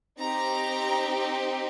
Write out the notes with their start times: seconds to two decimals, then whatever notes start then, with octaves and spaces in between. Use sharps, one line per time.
0.19 C4 D#4 G4 A#5